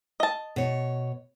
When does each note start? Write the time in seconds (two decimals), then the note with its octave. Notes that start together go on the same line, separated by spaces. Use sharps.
0.20 D#5 A5
0.56 B2 C#5